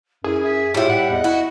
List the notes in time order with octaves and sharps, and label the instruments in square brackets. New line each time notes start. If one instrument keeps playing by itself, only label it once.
[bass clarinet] F#2 [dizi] E4 [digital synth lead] G#4
[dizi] E5
[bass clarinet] A2 [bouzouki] G3 E4 [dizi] F4
[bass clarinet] A2 [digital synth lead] F#5 [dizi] G5
[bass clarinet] E2 [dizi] D#5
[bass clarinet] E4 [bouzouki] F#4